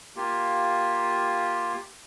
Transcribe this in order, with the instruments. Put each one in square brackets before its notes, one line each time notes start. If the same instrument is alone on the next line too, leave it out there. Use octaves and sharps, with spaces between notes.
[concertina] A#3 F4 G4